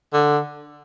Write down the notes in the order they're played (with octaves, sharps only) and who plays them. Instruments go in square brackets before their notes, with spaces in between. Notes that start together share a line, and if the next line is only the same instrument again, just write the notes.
[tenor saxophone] D3